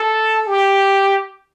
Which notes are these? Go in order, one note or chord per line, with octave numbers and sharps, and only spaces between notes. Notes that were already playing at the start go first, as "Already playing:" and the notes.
Already playing: A4
G4